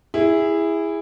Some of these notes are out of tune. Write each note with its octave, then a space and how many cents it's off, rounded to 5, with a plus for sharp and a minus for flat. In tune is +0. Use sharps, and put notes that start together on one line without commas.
E4 +0 G#4 -20